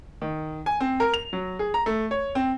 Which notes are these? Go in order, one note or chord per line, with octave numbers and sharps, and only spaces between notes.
D#3
G#5
C4
A#4
F7
F#3
G#4
A#5
A3
C#5
C4